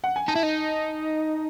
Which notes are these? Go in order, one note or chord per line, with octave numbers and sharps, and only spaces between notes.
F#5
G#5
D#4 A5
E4
D#4